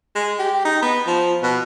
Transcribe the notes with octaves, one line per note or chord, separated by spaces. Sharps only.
G#3
G4
D#4
B3
F3
B2